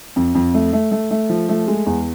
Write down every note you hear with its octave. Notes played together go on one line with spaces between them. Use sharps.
F2
F2
A3
A3
A3
A3
F3
A3
G#3
E2